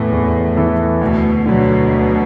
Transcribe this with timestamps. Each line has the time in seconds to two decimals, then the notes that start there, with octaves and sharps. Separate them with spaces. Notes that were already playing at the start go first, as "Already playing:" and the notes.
Already playing: E2 A2 E3 B3 E4 A4
0.12 E2
0.57 E3 B3 E4 A4
1.01 D2 B2
1.45 B2 D3 F#3
1.91 D2